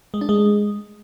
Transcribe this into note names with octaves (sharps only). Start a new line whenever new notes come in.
G#3
D4
G#3